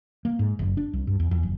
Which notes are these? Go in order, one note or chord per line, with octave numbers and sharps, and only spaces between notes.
A#3
G#2
F#1
D4
C2
G2
E2
E2
F#1